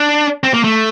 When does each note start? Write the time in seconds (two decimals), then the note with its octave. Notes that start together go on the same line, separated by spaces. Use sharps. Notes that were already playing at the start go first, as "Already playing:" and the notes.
Already playing: D4
0.44 C4
0.54 A#3
0.64 A3